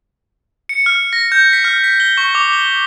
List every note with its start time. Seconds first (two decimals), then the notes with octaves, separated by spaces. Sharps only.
0.69 C#7
0.86 F6
1.13 A#6
1.32 G6
1.53 B6
1.65 F6
1.84 B6
2.00 G7
2.17 C#6
2.35 D6
2.53 G7